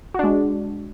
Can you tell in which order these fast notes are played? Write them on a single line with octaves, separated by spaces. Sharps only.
F#4 D4 G#3